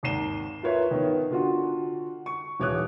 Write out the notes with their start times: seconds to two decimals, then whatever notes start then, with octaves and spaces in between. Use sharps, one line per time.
0.03 G#1 D#2 A#5 C7 E7 G7
0.62 E4 F4 A#4 B4 C#5 E5
0.91 D#3 B3
1.30 D3 F4 F#4
2.26 C#6
2.60 D#1 E3 C#5 D6 D#6 F#6